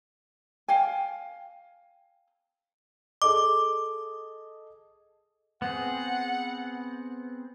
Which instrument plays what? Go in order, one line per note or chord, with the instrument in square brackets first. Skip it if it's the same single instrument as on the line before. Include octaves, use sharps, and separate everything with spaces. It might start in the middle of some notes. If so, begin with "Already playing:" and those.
[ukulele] F5 G5 G#5
[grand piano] G#4 A4 D#5 [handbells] D6
[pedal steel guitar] B3 C4 G#4 [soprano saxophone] F#5